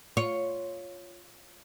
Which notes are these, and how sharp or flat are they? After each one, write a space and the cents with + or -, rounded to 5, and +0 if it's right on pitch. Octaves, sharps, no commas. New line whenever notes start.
F4 +0 C#5 +0